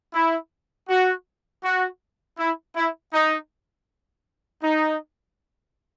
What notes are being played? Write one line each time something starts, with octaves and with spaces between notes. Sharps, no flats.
E4
F#4
F#4
E4
E4
D#4
D#4